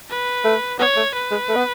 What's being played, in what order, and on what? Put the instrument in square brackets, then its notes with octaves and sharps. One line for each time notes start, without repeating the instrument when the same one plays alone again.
[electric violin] B4
[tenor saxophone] A3
[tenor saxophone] B3 [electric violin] C#5
[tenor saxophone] A3
[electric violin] B4
[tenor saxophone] G#3
A3
B3